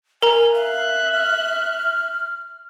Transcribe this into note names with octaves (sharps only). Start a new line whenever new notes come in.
A#4 G#5 A#5
E5 F5 F#6
F6